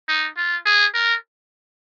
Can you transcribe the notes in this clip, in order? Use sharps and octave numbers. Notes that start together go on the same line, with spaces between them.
D#4
F4
G#4
A#4